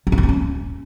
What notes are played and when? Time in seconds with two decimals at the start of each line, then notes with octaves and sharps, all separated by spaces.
0.07 F#3
0.12 C4
0.18 F3
0.23 C4
0.29 C#4